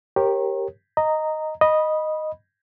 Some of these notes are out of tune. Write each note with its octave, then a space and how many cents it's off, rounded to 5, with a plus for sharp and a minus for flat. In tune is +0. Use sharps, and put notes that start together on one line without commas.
G4 +0 A#4 +0 C#5 -35
D#5 +0 A#5 -10
D#5 -5 B5 -20